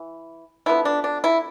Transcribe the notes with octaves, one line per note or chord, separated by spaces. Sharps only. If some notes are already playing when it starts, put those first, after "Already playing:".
Already playing: E3
D3 F3 B3 E4
D4
D4
E4